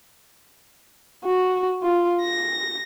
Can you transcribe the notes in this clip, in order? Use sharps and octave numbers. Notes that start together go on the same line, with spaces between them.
F#4
F4
A#6